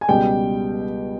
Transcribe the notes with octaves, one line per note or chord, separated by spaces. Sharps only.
G#5
C#2 B2 G3 G5